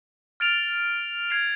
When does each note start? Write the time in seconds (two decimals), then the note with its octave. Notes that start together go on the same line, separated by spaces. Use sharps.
0.40 F6 A6 D7 F7
1.30 G#6 C7 F7